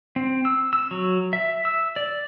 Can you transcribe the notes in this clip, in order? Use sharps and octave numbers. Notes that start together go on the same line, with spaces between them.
C4
E6
E6
F#3
E5
E6
D5